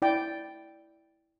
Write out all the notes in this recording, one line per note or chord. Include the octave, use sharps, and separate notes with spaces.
E4 D5 G5